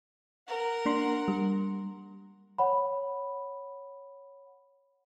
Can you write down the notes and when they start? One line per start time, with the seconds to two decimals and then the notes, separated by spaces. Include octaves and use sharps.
0.48 A#4 F#5
0.86 A#3 D4 C6
1.28 G3
2.58 C#5 F#5 B5